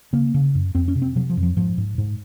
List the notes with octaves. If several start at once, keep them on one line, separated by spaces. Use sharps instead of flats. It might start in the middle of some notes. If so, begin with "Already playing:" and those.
C#3 A#3
C#3
F#2
F2 C4
C#4
C3
C4
C3 F#3
F3
F2
F3
G#2 F3
G#2
G#2